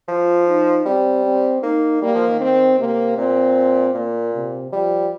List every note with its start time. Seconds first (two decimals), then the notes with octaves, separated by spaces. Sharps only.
0.08 F3 F4
0.47 D#4
0.86 G3 C4
1.24 C4
1.63 A#3 D#4
2.01 G3 A#3
2.15 F3
2.28 D#3
2.41 C4
2.79 C3 A#3
3.18 A#2 C4
3.94 A#2 A#3
4.34 C3
4.72 F3 G3